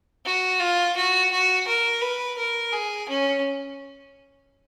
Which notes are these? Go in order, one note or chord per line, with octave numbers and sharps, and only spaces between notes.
F#4
F4
F#4
F#4
A#4
B4
A#4
G#4
C#4